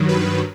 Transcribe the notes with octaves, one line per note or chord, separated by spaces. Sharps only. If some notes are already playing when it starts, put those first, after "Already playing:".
Already playing: G2 D#3 F#3
B4